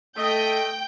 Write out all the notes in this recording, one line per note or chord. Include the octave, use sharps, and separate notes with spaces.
A3 D#5 G5 G6